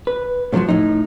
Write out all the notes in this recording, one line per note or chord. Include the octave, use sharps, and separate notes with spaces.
B4
A2 D3 D#3 F3 F#3
A2 D#4